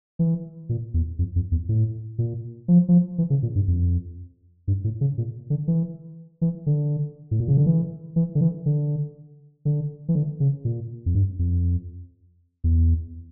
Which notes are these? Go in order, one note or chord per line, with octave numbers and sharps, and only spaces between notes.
E3
A#2
E2
F2
F2
E2
A2
A#2
F3
F3
E3
C#3
A#2
G2
F2
G2
A2
C#3
A#2
D3
E3
E3
D3
A2
A#2
C#3
D3
E3
E3
D3
E3
D3
D3
E3
D3
C#3
A#2
F2
G2
F2
E2